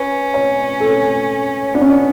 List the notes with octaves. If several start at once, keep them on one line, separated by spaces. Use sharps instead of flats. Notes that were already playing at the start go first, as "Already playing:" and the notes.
Already playing: C#4 B4
C#5
A4
B3 D4
C#4
D4